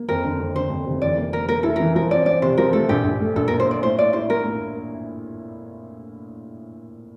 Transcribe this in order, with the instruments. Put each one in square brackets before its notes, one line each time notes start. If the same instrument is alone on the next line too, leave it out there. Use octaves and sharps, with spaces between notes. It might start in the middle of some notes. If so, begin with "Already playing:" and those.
Already playing: [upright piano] A#3
[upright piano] F2 [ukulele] A#4
[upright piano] D3
F2
[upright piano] D3 [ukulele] C5
[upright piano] F2
F1
[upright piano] E3 [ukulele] D5
[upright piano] A#3
[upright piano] A#3 [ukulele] A#4
[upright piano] A#3 [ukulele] A#4
[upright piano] E4 [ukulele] A4
[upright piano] E3 [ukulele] A#4
[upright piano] F3 [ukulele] A#4
[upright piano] C4 [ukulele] D5
[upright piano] C4 [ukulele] D5
[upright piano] C3 [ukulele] C5
[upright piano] F3 [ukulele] A#4
[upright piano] A3 [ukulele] A4
[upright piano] A#1 [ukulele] G4
[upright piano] A#1
A3
[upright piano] A#1 [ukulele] A4
[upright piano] A#2 [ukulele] A#4
[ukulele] C5
[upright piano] A#2 [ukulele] D5
[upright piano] A2 [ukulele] C5
[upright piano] A2 [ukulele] D5
[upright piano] E4 [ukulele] C5
[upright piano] A#3 [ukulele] A#4
[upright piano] A2